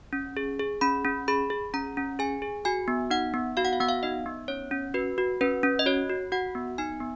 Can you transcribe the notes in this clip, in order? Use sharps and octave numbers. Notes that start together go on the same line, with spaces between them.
C#4
G#4
G#4
C#4 B5
C#4
G#4 B5
G#4
C#4 A#5
C#4
G#4 G#5
G#4
F#4 G#5
B3
D#4 F#5
B3
F#4 F5
F#5
F5
B3 F#5
F5
D#4 D#5
B3
C#4 C#5
C#4
F#4 B4
F#4
C#4 B4
C#4
D#5
F#4 C#5
F#4
F#4 F#5
B3
D#4 G#5
B3